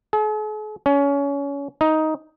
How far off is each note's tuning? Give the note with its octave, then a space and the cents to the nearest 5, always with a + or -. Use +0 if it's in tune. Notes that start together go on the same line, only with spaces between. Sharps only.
G#4 +45
C#4 +25
D#4 +10